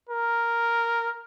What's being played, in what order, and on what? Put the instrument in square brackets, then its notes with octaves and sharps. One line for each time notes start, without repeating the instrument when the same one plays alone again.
[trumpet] A#4